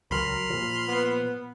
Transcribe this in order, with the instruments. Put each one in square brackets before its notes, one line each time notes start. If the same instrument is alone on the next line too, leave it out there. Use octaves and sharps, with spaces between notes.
[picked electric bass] C#2 F#3 [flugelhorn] A#4 [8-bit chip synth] B5 C6 F6
[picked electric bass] A#2 F3
[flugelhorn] B3